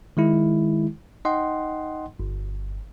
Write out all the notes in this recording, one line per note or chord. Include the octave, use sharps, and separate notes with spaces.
D#3 G#3 E4
D#4 D#5 F#5 G5 C6
G1